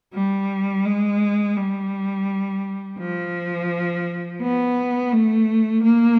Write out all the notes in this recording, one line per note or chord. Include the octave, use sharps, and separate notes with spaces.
G3
G#3
G3
F3
B3
A3
A#3